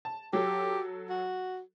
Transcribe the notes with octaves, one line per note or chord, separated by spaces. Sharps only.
A5
F#3 G4 A4
F#4